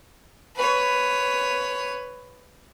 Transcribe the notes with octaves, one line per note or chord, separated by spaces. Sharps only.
B4 C#5